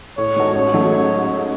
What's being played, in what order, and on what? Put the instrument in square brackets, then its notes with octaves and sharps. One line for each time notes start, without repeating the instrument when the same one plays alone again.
[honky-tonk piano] A2 [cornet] C#5
[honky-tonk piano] G#3 D#4 F#4 A4
[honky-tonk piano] A1 [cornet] C#5
[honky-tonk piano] G#2 F#3 A3